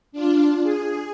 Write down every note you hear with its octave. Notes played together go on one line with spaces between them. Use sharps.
D4 F4
G#4